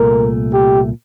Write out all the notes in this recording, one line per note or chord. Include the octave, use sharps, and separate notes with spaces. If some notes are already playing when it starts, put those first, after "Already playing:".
Already playing: C2 A#2 A3 A#4
G4